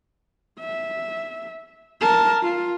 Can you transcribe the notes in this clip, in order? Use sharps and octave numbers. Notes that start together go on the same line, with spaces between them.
E5
A#4 A5
F4